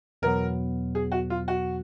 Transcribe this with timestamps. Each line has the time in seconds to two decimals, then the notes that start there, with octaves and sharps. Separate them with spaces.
0.22 E2 B2 F#3 B3 A#4
0.95 G#4
1.12 F#4
1.30 F4
1.48 F#4